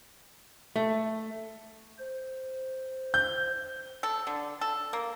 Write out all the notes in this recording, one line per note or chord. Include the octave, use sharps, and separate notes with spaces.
A3 E5
C5
G6
A4
D3
A4
A#3